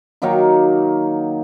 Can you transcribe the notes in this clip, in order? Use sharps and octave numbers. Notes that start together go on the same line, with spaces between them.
D#3 F#3 A#3 D#4